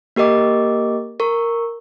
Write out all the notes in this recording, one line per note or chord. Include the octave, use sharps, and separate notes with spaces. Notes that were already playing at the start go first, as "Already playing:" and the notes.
A#3 G4 A#4 D#5 D6
A#4 C#6